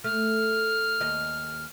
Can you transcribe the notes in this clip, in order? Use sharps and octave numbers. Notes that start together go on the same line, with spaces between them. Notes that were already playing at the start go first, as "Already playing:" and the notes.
A3 F6
D#2 D#5